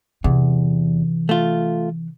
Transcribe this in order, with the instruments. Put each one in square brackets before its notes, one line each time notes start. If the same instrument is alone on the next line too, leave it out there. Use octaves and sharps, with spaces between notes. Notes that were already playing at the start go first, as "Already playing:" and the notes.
[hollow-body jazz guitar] E2 [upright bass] C3 E3
[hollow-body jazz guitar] A3 F4